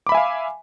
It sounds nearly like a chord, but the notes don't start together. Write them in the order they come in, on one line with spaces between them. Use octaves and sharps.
D6 B5 E5 G#5 F5